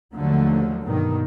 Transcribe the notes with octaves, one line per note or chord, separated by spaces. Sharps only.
D#2 D3 F3 F#3 A3
G2 B2 D#3